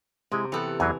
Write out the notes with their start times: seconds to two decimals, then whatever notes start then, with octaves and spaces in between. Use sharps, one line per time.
0.32 C3 G#3 E4
0.52 E3 B3 G4 A4 F#5
0.80 E2 E3 F#3 G#5